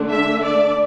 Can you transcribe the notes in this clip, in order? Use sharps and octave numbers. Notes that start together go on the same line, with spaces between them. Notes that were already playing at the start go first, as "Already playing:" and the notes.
Already playing: D3 A3 D4
E5
D5